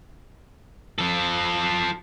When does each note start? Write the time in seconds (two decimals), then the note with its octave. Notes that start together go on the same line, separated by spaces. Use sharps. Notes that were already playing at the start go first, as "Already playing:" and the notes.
0.99 F3 A4